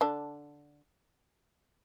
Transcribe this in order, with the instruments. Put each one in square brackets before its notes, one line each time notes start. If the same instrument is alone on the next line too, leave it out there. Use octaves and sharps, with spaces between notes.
[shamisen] D3 D4